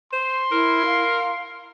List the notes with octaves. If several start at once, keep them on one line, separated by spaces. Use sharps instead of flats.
C5 C6
E4 A#4
F5